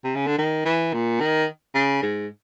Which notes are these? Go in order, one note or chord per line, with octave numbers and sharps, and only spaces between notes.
C3
C#3
D3
D#3
E3
A#2
D#3
C#3
G#2